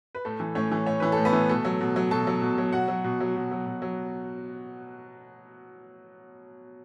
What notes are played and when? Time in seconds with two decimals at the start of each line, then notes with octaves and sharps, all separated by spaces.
0.15 B4
0.25 A2 A3 A4
0.40 E3
0.55 A2 C#4 C#5
0.72 E3
0.86 A2 C#5
1.00 E3 B4
1.12 A2 A4
1.25 B3 B4
1.33 E3
1.49 B2 A3 A4
1.65 F#3
1.80 B2
1.96 F#3
2.11 B2 A4 A5
2.27 F#3
2.42 B2
2.58 F#3
2.73 B2 F#4 F#5
2.88 F#3
3.04 B2
3.20 F#3
3.36 B2
3.51 F#3
3.66 B2
3.82 F#3